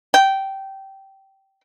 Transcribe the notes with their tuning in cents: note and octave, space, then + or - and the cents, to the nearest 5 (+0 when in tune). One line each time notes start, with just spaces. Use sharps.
G5 -15